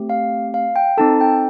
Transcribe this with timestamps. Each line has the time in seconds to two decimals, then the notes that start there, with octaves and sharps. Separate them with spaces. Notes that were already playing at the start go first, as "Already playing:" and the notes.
Already playing: A3 C4 G4
0.10 F5
0.54 F5
0.76 G5
0.97 C4 D#4 A4 A5
1.21 G5